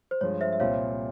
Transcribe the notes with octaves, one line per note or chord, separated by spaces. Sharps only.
C5
G2 F3 G#3 C#5
C5 E5
E5
C2 A#2 G3 C4 F4 C#5 F5